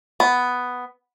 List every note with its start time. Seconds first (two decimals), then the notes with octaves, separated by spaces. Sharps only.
0.20 B3